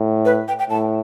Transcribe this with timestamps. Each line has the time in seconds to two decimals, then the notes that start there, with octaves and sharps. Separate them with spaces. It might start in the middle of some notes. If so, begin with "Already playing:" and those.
Already playing: A2
0.25 B4
0.48 G5
0.59 G5
0.70 A2 A5